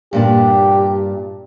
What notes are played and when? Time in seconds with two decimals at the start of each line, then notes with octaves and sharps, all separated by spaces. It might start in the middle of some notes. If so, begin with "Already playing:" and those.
0.13 G2 A#2 D4 G4